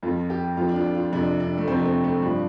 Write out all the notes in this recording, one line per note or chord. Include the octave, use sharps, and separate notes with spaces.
F2 F3 F4
G4
F2 F3 F4
D4
F4
F4
F2 C3 F3 D4
D4
A3
F2 C3 F3 C4
A3
C4
A3
G2 F3 D4